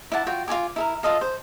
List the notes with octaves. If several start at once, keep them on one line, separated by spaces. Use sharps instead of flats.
E4 D5 F#5 A5
F4 F#4 G5
F4 F#4 G#5 D6
E4 A4 A#4
F4 A4 D#5 F5
C5